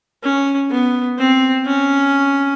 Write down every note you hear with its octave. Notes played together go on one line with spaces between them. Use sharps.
C#4
B3
C4
C#4